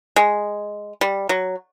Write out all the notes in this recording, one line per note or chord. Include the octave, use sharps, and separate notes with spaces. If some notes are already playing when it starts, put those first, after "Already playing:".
G#3
G3
F#3